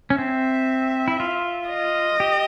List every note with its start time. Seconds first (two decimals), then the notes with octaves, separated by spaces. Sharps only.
0.10 C#4
0.18 C4 E5
1.08 E4
1.20 F4
1.69 D#5
2.20 G4